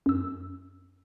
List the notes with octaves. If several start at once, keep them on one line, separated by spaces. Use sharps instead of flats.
F#2 E6